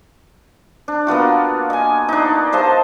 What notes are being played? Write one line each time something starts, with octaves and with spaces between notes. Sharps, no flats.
D4
A#3 B3 F4 F#4
D#5 G#5
D4 D#4
C5 D#5 F5 A5